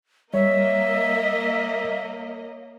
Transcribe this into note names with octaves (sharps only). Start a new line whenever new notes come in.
G3 A#3 C#5 D#5 E5